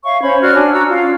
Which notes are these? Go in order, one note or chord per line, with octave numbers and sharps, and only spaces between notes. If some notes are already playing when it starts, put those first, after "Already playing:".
C#5 E5 F5 C#6
C#4 C5 C#5 B5
F#4 D5 F6
D4 G#5
F#4 A#5 E6
C#4 F4 F5